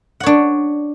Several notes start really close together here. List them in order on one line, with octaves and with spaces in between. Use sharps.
F#5 C#5 D4